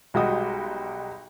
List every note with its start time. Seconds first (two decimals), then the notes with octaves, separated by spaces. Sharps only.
0.14 B1 G3 G#3 F#4 G4 D#6